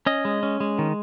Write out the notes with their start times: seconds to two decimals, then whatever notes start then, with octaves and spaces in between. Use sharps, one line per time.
0.06 C#4 D#5
0.25 G#3
0.43 C#4
0.60 G#3
0.79 D#3